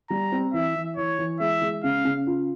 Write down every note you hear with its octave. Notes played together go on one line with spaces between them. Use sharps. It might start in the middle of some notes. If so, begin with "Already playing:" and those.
G3 A#5
C4
E3 E5
E3
E3 C#5
E3
G#3 E5
G#3
C#3 F5
C#3
F4